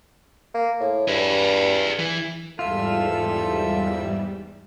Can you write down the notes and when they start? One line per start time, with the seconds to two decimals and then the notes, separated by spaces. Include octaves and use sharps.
0.54 A#3
0.80 A2
1.08 G2 G#4 B4
1.99 E3
2.59 E2 G#2 G3 F4 A4 E5